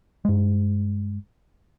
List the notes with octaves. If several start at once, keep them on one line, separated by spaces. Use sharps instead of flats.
G2 G#3